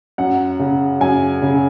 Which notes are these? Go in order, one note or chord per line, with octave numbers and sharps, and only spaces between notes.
F#2 F#5
C#3
F#2 G#5
C#3